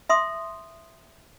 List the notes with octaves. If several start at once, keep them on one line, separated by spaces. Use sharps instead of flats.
E5 C6 D#6